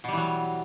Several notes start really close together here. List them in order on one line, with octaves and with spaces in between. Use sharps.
B2 G3 E3 F#3